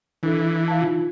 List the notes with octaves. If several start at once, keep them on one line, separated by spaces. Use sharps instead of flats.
E3 D4 A4
F5 A5
D#4 F4